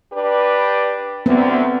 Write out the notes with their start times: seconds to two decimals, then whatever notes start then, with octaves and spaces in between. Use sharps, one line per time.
0.13 D4 G4 B4
1.26 D2 B3 C4